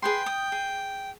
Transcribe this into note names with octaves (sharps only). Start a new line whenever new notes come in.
G#4 B4 G5 C6
D#6
G#4